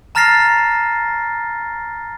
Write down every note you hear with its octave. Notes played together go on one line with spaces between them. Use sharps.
A5 A#5 F6 A6 A#6 C7